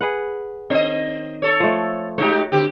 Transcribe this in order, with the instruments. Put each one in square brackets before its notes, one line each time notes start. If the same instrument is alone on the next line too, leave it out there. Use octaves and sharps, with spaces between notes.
[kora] G#4 B4 F#5
[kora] D#3 [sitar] C4 D#5
[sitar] A4 C#5
[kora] F3 A3
[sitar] G#3 D#4 G4 [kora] F#4 C#5
[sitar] D3 C4 G4